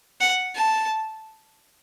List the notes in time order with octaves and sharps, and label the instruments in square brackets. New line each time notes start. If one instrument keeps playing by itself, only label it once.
[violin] F#5
A5